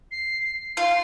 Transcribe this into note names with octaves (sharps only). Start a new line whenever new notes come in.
C7
F4 C6